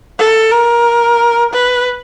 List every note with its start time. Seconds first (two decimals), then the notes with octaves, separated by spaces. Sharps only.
0.18 A4
0.52 A#4
1.53 B4